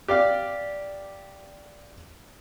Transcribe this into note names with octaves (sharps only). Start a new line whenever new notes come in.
G4 D5 F5